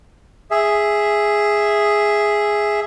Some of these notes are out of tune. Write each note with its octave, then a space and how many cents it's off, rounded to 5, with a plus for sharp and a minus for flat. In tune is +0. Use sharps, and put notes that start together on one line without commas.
G#4 +0 E5 +0